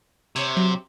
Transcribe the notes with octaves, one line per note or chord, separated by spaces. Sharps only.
C3 C#5
F#3